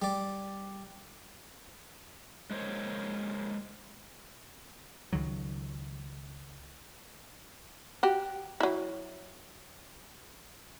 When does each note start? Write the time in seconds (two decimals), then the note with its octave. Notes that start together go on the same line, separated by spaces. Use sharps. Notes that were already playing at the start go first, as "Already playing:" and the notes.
0.02 G3 D5
2.50 G#3 A#3 C5 C#5
5.13 C#2 D#3 F#3
8.03 F#4 G4
8.60 F#3 E4